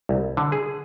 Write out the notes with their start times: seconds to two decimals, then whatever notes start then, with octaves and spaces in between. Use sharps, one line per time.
0.09 C2
0.37 D3
0.52 G#4